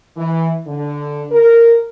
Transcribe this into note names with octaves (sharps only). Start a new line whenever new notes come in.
E3
D3
A#4